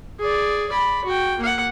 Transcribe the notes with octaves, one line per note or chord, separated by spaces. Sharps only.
G#4 D5
D5 B5
F#4 G5
A#3 F#5